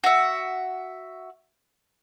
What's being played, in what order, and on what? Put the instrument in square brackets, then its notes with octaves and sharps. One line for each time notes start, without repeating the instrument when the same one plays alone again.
[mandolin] F#4 E5